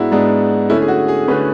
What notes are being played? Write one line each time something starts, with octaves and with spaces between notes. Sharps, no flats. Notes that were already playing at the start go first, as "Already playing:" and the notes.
Already playing: G#2 G#3 B3 D4 E4 F#4
G#2 G#3 B3 D4
D3 A3 C#4 E4
G#4
F#4
G#4
D3 A3 C#4 B4